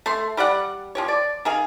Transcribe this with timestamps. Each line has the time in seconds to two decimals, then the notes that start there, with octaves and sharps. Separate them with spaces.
0.06 A3 C6
0.37 G3 G4 D5 F#5
0.95 F3 G4 C#5
1.08 D5
1.45 D#3 G#4 F5